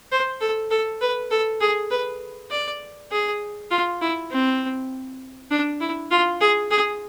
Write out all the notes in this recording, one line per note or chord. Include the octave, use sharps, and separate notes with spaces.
C5
A4
A4
B4
A4
G#4
B4
D5
G#4
F4
E4
C4
D4
E4
F4
G#4
G#4